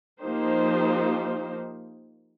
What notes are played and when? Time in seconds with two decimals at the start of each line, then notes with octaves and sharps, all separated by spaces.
0.21 F3 A#3 D#4 G4 C5